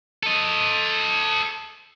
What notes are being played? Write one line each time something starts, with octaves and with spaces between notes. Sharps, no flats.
A4 D#5